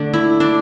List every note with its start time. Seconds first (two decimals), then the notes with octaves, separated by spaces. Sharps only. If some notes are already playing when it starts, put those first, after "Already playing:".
Already playing: D3 A3 D4
0.13 E4
0.40 D4